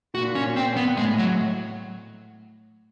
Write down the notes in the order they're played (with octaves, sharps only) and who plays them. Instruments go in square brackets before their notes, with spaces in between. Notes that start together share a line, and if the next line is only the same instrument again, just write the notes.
[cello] A#2 [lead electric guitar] F#4
[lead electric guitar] C#4
C4
B3
[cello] A2 [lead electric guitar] G#3
[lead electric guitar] F#3